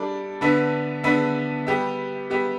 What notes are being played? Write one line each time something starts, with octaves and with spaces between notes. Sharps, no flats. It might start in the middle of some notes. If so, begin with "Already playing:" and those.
Already playing: G3 D4 A4 D5
D3 B3 D4 B4 E5
D3 B3 D4 B4 E5
G3 B3 G4 E5
G3 B3 G4 E5